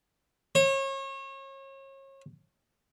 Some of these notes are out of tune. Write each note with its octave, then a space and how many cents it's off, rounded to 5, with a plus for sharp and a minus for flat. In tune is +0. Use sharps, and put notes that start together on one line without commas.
C#5 -35